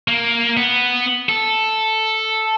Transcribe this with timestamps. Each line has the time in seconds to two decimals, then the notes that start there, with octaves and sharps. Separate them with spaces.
0.08 A#3
0.57 B3
1.29 A4